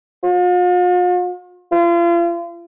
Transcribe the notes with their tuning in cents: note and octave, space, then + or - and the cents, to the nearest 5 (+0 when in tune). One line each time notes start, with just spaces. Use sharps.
F4 +45
F4 -35